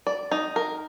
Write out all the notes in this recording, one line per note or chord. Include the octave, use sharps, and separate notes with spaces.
D5
D#4
A#4